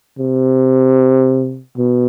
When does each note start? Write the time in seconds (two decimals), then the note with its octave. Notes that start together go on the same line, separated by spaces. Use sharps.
0.18 C3
1.77 B2